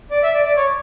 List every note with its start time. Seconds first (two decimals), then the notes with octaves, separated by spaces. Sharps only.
0.11 D5
0.23 E5
0.34 D5
0.45 D5
0.57 C#5